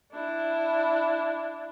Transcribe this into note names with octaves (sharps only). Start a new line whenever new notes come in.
D4 E4